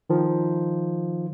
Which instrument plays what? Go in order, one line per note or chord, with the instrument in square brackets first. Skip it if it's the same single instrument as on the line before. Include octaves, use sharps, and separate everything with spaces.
[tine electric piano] D#3 F3